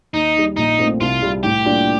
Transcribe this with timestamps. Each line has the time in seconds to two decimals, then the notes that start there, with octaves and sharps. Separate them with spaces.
0.14 D#2 D#4
0.36 D#3 G3
0.57 A#1 D#4
0.78 A#2 A3 C4
1.01 C2 F4
1.22 C3 G3
1.43 A2 G4
1.64 G3 A#3 D4 F4